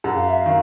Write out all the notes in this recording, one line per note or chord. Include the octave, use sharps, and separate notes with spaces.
F#2 F#5
F5
E5
F5
D#3